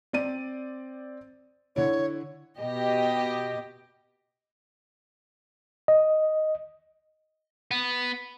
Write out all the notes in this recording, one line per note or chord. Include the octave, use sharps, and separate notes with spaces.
C4 D5 D#7
D3 E4 C#5
B2 G4 D#5
D#5
B3